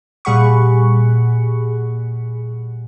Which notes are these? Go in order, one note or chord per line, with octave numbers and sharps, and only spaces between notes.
A#2 G3 G#4 F#5 B5 C#6